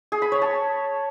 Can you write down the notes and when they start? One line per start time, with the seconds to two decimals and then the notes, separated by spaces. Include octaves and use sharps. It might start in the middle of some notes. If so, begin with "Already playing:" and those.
0.12 G#4
0.22 B5
0.32 C#5
0.42 A5